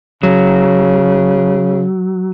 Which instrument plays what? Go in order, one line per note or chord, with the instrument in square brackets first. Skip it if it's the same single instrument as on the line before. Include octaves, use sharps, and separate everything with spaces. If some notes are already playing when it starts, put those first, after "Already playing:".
[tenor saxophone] C#3 [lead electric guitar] F#3